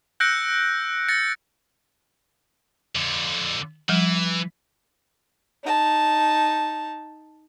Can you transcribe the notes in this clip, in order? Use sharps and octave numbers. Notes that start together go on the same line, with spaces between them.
E6 F#6 G6 A#6 C#7 D7
A6 A#6 C#7
F2 D3
E3 F3 G3
D#4 A5